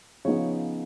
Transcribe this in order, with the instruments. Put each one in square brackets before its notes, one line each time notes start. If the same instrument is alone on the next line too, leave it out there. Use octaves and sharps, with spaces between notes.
[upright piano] C#3 F3 B3 D#4 C#5